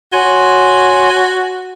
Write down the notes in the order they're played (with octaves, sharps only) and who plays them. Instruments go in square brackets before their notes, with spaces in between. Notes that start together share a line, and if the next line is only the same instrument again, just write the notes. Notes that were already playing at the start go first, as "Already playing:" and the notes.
[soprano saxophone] F#4 [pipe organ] C#5 G#5 C6